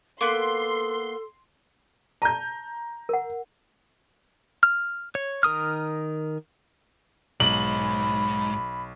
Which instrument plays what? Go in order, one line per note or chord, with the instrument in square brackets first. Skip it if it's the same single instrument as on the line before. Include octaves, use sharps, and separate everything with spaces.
[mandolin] A#3 B3 [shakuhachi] A4 [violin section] C6
[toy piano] A5 [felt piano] A#5 G6
[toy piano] A#4 F#5
[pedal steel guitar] F6
C#5
D#3 A#4 D#6 F6
[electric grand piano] B1 [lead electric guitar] G#2 [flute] B5 [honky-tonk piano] F#7